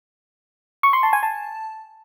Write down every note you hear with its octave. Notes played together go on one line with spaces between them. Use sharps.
C#6
C6
A5
G#5
A5